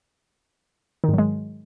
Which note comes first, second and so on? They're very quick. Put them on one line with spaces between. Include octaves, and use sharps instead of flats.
D#3 G#2 F#3 G#3